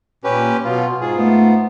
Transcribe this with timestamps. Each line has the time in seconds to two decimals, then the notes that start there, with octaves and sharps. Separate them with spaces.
0.24 A#2 C#4 G4 B4
0.65 B2 F#3 F4
1.01 G#2 F4 G#4
1.16 G#2 A3 B3